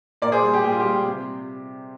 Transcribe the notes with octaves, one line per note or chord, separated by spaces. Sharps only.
A#2 A#4 D5
G#4 C5
G3
G4
A#2 G4
F4
G3 G4
C3